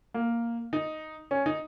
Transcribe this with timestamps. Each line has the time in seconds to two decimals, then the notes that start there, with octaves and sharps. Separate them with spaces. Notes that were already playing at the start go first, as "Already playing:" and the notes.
0.14 A#3
0.73 D#4
1.31 C#4
1.46 D#4